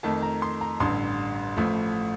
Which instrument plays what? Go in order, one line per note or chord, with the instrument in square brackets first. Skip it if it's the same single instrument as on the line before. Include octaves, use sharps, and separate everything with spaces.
[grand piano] F2 D#3 A3 A5
A#5
C6
A#5
A1 G2 D3 G3 C6
A1 A2 F3 A3